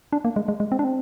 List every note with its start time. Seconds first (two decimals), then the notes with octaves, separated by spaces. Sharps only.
0.13 D4
0.25 A#3
0.36 G#3
0.48 G#3
0.60 G#3
0.72 C4
0.79 D4
0.84 C4